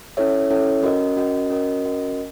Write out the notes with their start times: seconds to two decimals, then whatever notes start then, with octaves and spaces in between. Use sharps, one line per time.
0.17 C#4 E4 A4 C#5 E5
0.50 C#4 E4 A4 C#5 E5
0.83 C#4 F#4 A#4 D#5
1.16 C#4 F#4 A#4 D#5
1.50 C#4 F#4 A#4 D#5
1.84 C#4 F#4 A#4 D#5